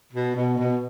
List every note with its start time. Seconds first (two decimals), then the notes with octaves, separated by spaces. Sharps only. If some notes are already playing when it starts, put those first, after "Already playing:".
0.12 B2
0.35 B2
0.57 B2